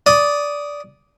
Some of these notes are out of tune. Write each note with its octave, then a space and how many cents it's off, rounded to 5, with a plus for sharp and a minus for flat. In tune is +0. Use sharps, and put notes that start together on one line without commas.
D5 -10 D#6 +0